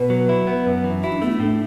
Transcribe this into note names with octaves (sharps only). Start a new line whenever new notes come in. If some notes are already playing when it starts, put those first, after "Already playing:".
Already playing: B2 B4
F#3
E4
B3
F#2
E3
E4 F#4
D4
A3 B3
E4
D4
A2